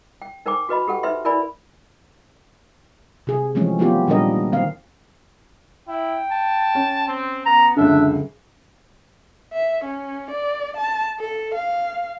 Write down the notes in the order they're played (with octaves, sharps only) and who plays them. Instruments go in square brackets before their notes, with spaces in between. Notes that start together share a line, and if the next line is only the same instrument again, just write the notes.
[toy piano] G5
D#4 A#4 C5 G5 G#5 D6
F#4 B4 D#5 B5
G4 A4 F#5 G5
D#4 B4 C5 E5 C6
E4 A#4 D5 G#5 B5
[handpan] C3 G#4
E3 F3 G#3 A3 C4 C#4
F#3 A3 B3 C4 F4 G4
A#2 D#3 G3 D4 A#4 D#5
D#3 C4 F5
[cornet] E4 [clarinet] G5
[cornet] A5
[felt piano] C#4
[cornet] C4
[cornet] B3 [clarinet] A#5
[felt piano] C#2 F#2 D3 [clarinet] D4 [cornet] E5
[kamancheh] E5
C#4
D5
A5
A4
F5